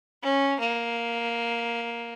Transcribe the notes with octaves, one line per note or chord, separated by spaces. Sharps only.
C#4
A#3